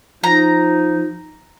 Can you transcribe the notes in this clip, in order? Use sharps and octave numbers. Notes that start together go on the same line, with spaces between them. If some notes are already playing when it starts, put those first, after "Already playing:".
F3 D#4 A#5